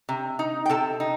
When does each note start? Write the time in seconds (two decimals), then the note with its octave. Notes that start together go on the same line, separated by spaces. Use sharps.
0.09 C3
0.39 D#4
0.66 G5
0.69 C3 A4 A5
1.00 D#4